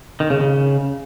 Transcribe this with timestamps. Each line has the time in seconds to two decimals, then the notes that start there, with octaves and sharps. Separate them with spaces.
0.20 D#3
0.30 C#3
0.40 C#3